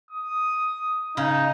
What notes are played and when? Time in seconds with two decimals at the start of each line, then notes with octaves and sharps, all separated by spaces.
0.11 D#6
1.17 C#3 D#4